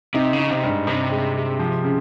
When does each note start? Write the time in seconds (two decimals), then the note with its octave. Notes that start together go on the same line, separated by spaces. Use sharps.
0.14 C3 D#4
0.33 C#3
0.39 D#4
0.51 C3
0.63 G2
0.69 G#2
0.87 G2 C3
1.11 G#3
1.36 G#3
1.59 F3
1.84 C#3